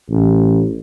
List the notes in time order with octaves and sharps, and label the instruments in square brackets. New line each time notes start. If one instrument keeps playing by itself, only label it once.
[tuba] A1